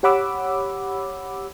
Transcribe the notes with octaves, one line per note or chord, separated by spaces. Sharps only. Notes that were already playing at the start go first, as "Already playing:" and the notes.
G4 C#5 F#5 B5 D6 E6